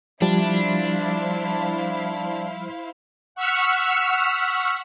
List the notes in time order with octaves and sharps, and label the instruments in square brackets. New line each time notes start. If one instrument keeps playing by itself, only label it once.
[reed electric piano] F3 G3 [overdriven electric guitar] D4 [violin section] E4 C5 F5
[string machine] F#5 C#6 E6 F6 B6